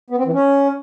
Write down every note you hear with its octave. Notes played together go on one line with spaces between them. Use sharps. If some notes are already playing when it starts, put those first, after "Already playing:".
B3
C4
E3
C#4